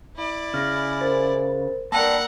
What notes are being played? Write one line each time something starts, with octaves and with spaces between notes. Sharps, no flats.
E4 D5
C#3 F6 A#6
A#4 C5 A6
A#3 A#4 D5 F#5 G5 A5 E6 A#6